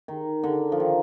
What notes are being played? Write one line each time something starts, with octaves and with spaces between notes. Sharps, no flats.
D#3
D3
F3
D#3